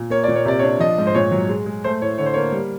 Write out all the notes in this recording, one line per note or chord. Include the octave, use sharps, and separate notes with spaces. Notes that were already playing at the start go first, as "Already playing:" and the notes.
Already playing: A#2
A#3 C#5
A#2 D5
C#5
C3 D5
C#5
D4
F3 D#5
G#2
C5
A#2 C#5
F#3
G#3
G#3
A3 C5
A2 C#5
D3 C#5
C5
A#3 C#5
G3